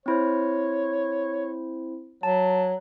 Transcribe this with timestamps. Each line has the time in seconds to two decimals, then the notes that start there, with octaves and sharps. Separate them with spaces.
0.06 C4 E4 C5 C#5
2.23 F#3 A5